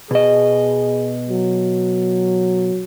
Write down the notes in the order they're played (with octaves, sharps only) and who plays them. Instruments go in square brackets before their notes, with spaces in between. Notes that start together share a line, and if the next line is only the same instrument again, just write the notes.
[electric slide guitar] B2 D#5 [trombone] G#4
[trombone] F#3